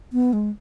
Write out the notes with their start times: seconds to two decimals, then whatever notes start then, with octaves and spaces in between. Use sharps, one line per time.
0.13 B3
0.33 G#3